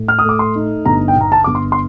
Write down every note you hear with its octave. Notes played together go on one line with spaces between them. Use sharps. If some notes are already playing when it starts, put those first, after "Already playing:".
Already playing: A2
F6
D#6
A3 D6
C6
D#4
G1 A#5
G5
G1 A#5
A5
G1 D6
C6
C6